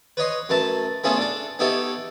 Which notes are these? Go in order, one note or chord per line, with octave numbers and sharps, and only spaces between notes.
B4 C#5 D#5 C6
F#2 A3 B4 A5
A3 B3 C#4 F4 G#4 A4
D4 A4
B3 D#4 E4 G4 A4 C#5